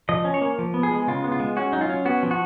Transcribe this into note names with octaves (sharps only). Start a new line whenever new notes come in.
F3 D#5
C#4
C#5
A#3
F3
B3
G#4
G#3
C#3 F4
B3
F4
G#3
C#4 F#4
F#3 D#4
F4
C#4
B3 F#4
F3
F#4